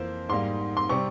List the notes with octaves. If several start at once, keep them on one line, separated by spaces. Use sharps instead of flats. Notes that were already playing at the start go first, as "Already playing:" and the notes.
Already playing: F2 E3 A#3 C5
G#2 G3 A#3 C6
C6
C3 G3 C4 C#6